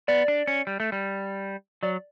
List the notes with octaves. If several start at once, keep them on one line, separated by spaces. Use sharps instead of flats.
B3 D5
D4
C#4
G3
A3
G3
F#3 D5